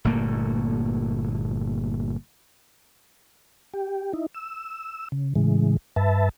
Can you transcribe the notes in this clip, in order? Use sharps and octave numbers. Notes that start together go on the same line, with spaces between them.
G1 A#2 A3 A#3
G4
D#4 E4
E6
C#3
A2 C#3 E3 G#3
G2 B4 E5 A5